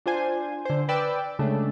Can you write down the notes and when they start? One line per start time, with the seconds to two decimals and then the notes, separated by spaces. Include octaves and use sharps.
0.06 D4 F4 C5 G#5
0.65 D3 C5
0.89 B4 D5 G5 E6
1.39 C#3 G#3 A3 D4